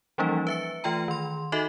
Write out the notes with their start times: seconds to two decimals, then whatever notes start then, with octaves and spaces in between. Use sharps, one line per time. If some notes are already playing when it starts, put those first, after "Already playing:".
0.18 E3 F3 G3 A#3 C#4 D#4
0.47 B4 E5 C#7
0.84 E3 A3 F4 G5 A#5
1.08 D#3 C6
1.52 D#4 F#4 A4 D#5 E5